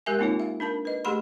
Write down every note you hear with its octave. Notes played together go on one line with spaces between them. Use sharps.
G#3 G4 A#4 E5 G#5
A#3 C4 D#4 F4 C#5
E5 F5
D4 A#4 A5 B5
B4 D#5
A3 G4 G#4 D#5 B5 C6